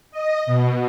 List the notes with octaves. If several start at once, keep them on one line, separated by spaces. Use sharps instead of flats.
D#5
B2